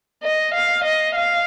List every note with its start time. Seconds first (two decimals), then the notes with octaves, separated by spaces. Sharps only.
0.23 D#5
0.54 F5
0.85 D#5
1.16 F5